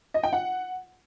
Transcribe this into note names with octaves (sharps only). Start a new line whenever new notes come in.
D#5
G5
F#5